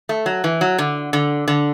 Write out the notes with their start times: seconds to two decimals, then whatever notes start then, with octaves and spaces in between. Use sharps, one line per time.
0.09 A3
0.26 F#3
0.44 E3
0.61 F#3
0.78 D3
1.13 D3
1.48 D3